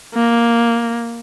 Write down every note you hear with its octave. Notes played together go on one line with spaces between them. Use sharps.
A#3